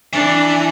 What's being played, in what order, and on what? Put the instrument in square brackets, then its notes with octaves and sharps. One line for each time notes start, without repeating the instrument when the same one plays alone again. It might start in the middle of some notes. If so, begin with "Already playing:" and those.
[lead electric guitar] E3 [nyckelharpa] D4